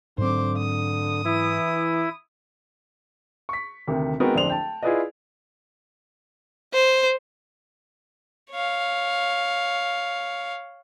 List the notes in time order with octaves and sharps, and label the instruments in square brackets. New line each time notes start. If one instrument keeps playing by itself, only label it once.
[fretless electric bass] G#2 F#3 C4 [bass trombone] D3 [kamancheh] C5 D6
[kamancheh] D#6
[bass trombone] E3 [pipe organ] E4
[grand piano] C#6 B6
D2 C3 D#3
G#3 B3 C4 D#4 F#4 A#4
D1 F2 D4 C5 F7 F#7
G5 A5
E4 F4 G#4 B4 D5 D#5
[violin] C5
[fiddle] C#5 F5